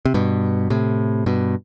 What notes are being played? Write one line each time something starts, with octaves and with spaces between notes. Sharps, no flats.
C3
G2 B2
A2 C3
G2 B2